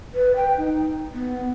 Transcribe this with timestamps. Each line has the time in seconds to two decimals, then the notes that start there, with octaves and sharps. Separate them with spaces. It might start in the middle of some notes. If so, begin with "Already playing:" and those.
0.14 B4
0.36 G5
0.58 D#4
1.14 B3